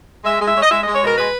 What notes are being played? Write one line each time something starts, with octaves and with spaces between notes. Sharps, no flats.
G#3 E5
G#3
E5
G#3 C#5
D#5
G#3 E5
G#3 D#5
C#5
B2 A#4
G#3 B4